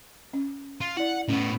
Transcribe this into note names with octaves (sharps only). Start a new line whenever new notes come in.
C#4
F4
E4 D5 F#5
A2 B3 C#4